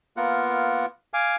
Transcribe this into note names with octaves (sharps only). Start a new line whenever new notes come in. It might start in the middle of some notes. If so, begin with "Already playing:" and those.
A#3 B3 F4 A#4 F#5
F5 G#5 D6